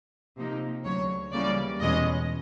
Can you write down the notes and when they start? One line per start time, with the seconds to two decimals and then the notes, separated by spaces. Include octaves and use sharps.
0.37 C3 F3 A#3 D#4
0.84 D2 C#3 F#3 C#5
1.32 C#3 E3 G3 A#3 D5
1.80 E2 B2 G#3 C#4 D#5